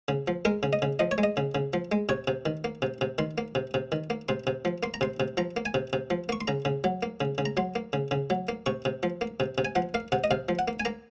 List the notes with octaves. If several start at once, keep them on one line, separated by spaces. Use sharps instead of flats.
C#3
F3
G#3 A#4
C#3
D#5
C#3
F3 D#5
C#5
G#3
D#5
C#3
C#3
F3
G#3
C3 C#5
C3
D#3
A#3
C3
C3
D#3 C6
A#3
C3
C3
D#3
A#3
C3 C6
C3
F3
A#3 C6
A#5
C3 C6
C3
F3 A#5
A#3
G#5
C3
C3
F3
A#3 C#6
C6
C#3 A#5
C#3
F#3
A#3
C#3
C#3
A#5
F#3 C6
A#3
C#3
C#3
F#3
A#3
C3 C#6
C3
F3
A#3
C3
C3
G#5
F3 F#5
A#3 F5
C3 F#5
D#5
C3 F5
F3
F#5
A#3
G#5
A#3 A#5